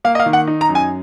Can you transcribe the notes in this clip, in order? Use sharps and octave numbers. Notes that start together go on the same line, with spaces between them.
A#3 F5
D#5
F5
D#3
F#5
D#4
A#5
F#2
G#5